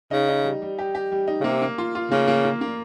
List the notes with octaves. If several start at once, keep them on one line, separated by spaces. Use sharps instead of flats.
C#3 D#4
D#4
G3
G3
G4
G4
G3
D#4
C#3
C3 A#3
A#3
F4
F4
C#3 A#3
A#3
A#3
A#3